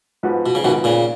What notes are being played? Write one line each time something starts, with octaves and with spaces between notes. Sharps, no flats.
G#2 F3 B3 F#4 B4
B2
C#3
G#2 B2 D#3 F3 B3 F#4 B4
A#2 C#3